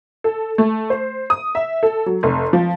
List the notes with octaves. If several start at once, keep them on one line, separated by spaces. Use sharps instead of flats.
A4
A3
C5
D#6
E5
A4
F#3
F1
F3